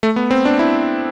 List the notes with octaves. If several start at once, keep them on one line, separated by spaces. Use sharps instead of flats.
A3
B3
C4
D4
E4